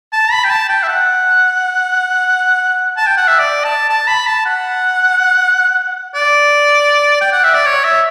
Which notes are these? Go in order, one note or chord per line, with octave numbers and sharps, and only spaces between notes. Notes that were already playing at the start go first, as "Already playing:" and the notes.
A5
B5
G5
A5
G5
E5
F#5
A5
G5
F#5
E5
D5
A5
A5
B5
A5
F#5
D5
G5
F#5
E5
D5
C#5
E5